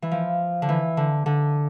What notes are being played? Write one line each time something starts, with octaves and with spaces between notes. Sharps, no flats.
E3
F3
D3
E3
D3
D3